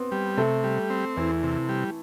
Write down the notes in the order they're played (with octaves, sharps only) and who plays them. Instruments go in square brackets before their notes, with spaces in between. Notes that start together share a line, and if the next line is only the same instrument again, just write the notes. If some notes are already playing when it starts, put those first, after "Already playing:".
Already playing: [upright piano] B3 C4
[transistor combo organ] G3
[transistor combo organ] C3 [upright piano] A3
[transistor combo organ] G3
C4
[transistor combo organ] E2 [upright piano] E3
[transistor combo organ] C3
G3